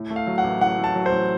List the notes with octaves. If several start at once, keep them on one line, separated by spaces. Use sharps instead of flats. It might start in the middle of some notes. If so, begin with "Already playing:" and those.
Already playing: A2
A3
F5
F#3
F#5
A1
A2 F#5
A3
A5
F#3
C5
A1